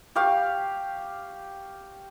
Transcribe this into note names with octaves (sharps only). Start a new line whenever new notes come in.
G4 F5 C#6